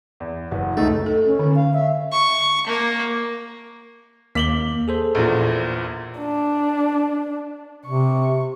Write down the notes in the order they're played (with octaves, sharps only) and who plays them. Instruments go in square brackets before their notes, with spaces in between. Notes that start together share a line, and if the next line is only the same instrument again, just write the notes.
[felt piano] E2
[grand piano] F#1 [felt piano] F#4 B4
[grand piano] C#2 [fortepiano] A3 [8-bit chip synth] D#4 [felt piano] F4 D#5
[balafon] A4
[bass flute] C#4
[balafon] D3
[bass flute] F5
E5
[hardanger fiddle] C#6
A#3
[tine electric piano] D#2 A#3 D6 [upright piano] B6 F#7 G7
[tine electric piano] G#4 A4 C5
[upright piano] A#1 E2 A#2
[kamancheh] D4
[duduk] C3 [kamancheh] C#6